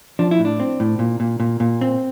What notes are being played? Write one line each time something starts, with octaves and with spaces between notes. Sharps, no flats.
F3 D4
E4
A2
D4
C4
A2
A#2
A#2
A#2
A#2
C4